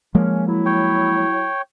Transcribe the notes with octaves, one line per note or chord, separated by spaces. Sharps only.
F3 G#3 A#3 C#4
F#3 E4
C#5 G5